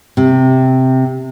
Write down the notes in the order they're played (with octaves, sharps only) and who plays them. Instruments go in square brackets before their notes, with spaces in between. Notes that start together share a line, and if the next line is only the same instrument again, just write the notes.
[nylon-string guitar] C3